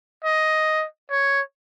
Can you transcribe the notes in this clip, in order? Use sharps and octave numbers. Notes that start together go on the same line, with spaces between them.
D#5
C#5